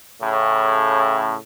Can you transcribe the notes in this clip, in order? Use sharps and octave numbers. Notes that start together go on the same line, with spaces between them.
A2 C#3